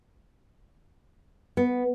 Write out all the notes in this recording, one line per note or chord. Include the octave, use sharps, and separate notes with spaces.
B3